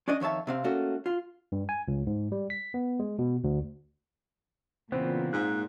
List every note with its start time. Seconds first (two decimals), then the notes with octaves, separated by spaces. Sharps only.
0.08 C#4 D4 D5 D#5
0.20 F2 D#3 C#5 E5 A5
0.47 C3 C4 F5
0.64 A3 A#3 C#4 F#4 A4
1.06 F4
1.52 G2
1.69 G#5
1.88 C#2
2.07 G#2
2.32 G3
2.50 B6
2.74 B3
2.99 G#3
3.19 B2
3.44 D2
4.92 A#2 C#3 E3 B3 C4
5.33 G#2 F#6